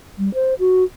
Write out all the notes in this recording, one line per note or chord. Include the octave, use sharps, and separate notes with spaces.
G3
C5
F#4